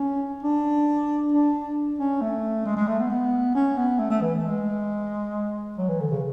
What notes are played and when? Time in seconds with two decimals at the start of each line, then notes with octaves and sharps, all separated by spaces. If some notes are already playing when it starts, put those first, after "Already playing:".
Already playing: C#4
0.43 D4
1.32 D4
1.99 C#4
2.21 A3
2.65 G#3
2.76 G#3
2.87 A3
2.99 B3
3.10 B3
3.55 C#4
3.77 B3
3.99 A3
4.10 A3
4.21 E3
4.43 G#3
5.78 F#3
5.89 E3
6.01 D3
6.11 C#3